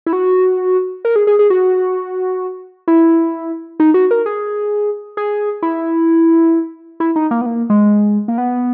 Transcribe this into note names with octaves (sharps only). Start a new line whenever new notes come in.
E4
F#4
A#4
G#4
G#4
G#4
F#4
E4
D#4
F#4
A#4
G#4
G#4
E4
E4
D#4
A#3
B3
A#3
G#3
A#3
B3